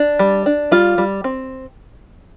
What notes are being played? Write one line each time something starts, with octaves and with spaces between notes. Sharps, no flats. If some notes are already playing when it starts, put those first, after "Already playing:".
Already playing: D4
G3
D4
G3 F4
G3
C4